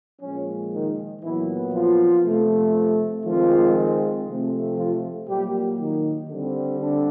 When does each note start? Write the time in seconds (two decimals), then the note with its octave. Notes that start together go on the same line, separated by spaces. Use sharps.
0.21 A#2 F3 G#3 C#4
0.71 D#3 D#4
1.22 A#2 E3 F#3 B3 E4
1.73 F3 F4
2.24 C3 F3 A3
3.25 D#3 F3 G#3 C4 F4
4.26 C3 F3 A3 C4
4.77 F3 F4
5.27 A#2 F#3 G3 A#3 G4
5.78 D#3 D#4
6.29 D3 G3 C4
6.79 D3 D4